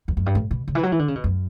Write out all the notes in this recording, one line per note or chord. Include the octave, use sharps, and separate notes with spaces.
E2
F#2
G2
A2
B2
C#3
E3
F#3
E3
D3
C#3
B2
F#2